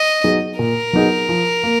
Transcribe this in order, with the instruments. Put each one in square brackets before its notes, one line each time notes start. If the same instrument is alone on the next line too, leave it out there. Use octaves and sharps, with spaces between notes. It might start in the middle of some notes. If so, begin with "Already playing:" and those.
Already playing: [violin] D#5
[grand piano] F#3 B3 D#4 G#4
[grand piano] A#2 [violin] A#4
[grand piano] F#3 B3 D#4 G#4
F3
A#3